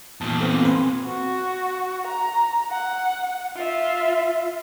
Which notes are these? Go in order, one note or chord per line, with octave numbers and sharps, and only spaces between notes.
E2 A#2 A5
B3 C4 A4
C4 B4 G#5 C6
F#4
A#5
F#5
F4 E5